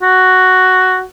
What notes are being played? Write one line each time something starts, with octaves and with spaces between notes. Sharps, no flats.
F#4